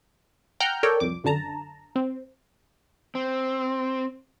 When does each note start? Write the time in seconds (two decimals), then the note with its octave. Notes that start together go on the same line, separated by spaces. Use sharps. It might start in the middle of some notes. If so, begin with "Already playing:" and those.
0.60 F#5 G5 A#5 F6 G6
0.83 A4 A#4 C#5 D5 G5
1.00 C2 F2 D6
1.24 G1 F#2 D3 A5 A#5
1.96 C4
3.15 C4